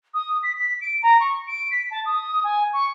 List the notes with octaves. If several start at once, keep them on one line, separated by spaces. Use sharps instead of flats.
D#6
B6
B6
D7
A#5
C#6
D7
B6
A5
D#6
G#5
C#6